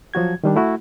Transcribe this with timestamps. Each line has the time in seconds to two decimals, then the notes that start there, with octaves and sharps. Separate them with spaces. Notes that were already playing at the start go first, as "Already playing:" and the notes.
0.14 F3 F#3 F#4 G#6
0.44 D#3 G3 D4
0.56 A3 E4 F#4